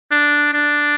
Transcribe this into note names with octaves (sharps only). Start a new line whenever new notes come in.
D4
D4